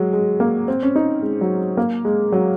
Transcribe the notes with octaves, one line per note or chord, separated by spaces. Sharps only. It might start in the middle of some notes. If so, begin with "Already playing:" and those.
Already playing: F#3 G#3
G#3
A#3
C4
C#4
D#4
G#3
F#3
A#3
G#3
F#3